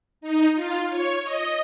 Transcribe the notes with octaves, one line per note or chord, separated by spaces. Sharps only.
D#4
F4
C#5
D#5